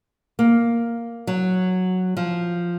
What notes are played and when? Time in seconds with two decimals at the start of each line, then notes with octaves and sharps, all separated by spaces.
0.39 A#3
1.27 F#3
2.17 F3